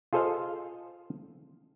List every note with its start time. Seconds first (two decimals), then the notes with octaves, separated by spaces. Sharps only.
0.13 F4 G#4 A4 C5 D#5 F5